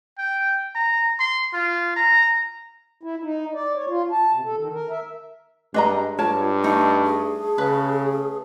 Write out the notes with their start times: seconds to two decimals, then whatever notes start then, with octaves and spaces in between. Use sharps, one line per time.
0.18 G5
0.75 A#5
1.20 C6
1.54 F4
1.96 A#5
3.03 E4
3.23 D#4
3.54 D5
3.75 C#5
3.88 F4
4.11 A5
4.33 C3
4.45 A4
4.57 D#3
4.73 A#4
4.90 E5
5.74 G2 G#3 D4 D#5 A#5
6.19 G2 F4 A#4 C#5 A5
6.64 A3 D#4 A4 D#5 D#6
7.05 G#4
7.58 C#3 B4